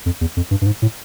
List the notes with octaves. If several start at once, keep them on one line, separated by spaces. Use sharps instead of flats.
F2
E2
F2
G2
G2
G#2
A2